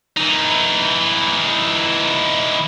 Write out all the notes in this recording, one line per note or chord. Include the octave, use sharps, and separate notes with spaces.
E3 D#4